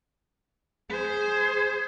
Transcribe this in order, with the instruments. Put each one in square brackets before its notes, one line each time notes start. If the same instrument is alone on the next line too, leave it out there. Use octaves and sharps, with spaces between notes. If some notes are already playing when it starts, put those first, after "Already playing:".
[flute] G#4 [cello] C5